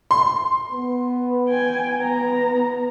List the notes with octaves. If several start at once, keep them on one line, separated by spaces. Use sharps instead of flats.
C6
B3
G5 G#5
B3 B4 A#5